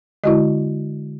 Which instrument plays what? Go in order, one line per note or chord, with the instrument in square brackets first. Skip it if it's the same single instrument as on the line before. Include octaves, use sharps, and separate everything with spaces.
[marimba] D3 G#3 [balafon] E4 F#4 D#5